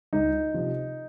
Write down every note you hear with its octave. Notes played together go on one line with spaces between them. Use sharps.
C#2 D#4
C3 F3